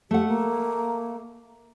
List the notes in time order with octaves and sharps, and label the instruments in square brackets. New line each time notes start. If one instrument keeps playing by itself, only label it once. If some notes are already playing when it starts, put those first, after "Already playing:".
[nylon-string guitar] A3 F#5 [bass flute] G4
[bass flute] A#3